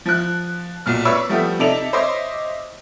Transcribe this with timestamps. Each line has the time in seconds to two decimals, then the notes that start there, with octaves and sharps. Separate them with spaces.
0.06 F3 F#6
0.86 B1 A#2 F6
1.05 B4 C#5 D5 C#6 E6
1.29 F3 G3 A3 B3 G4
1.59 C3 D#4 A4 D5 E5 F7
1.93 C5 C#5 D#5 E5 C6 D6